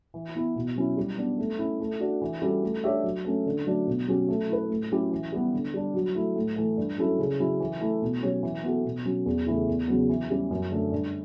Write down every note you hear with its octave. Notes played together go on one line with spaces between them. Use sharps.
E3
B3 E4
B2
F#3 C#4 E4
G3
B3 D4
A3
C#4 E4
A3
D4 F#4
E3
G3 C#4 F#4 A4
A3
D4 G4 C#5 E5
F#3
A3 C#4
D3
F#3 A3 D4
B2
F#3 C#4 G4
A3
E4 B4
A2
F#3 C#4 E4 G4
E3
G3 B3
D3
G3 D4
F#3
A3 E4
A2
E3 A3
G2
F#3 C#4 E4 A4
C#3
F#3 C#4 E4
E3
A3 E4
B2
F#3 C#4 G4 C#5
E3
B3 F#4 A4
B2
F#3 C#4
E2
C#3 E3 A3 E4
E2
C#3 F#3 B3
E3
G3 C#4 G4
F#2
D3 A3
G2